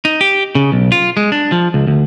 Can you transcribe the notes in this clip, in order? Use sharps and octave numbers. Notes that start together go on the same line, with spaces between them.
D#4
G4
C#3
B1
F4
G#3
D4
F3
C#2
D2